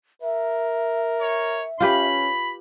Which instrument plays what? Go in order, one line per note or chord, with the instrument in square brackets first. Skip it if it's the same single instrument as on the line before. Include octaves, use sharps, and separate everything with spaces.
[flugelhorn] A#4 [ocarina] E5
[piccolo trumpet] C#5
[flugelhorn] C#4 [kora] F4 G4 B4 [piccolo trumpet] B5